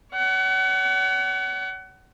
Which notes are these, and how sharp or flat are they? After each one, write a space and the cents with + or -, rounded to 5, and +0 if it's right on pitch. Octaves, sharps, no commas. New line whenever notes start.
C#5 +45 F#5 +30